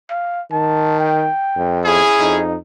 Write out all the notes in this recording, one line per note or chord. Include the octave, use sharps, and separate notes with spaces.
F5
D#3 A5
G5
F2
C#4 E4 G#4
F2 D#4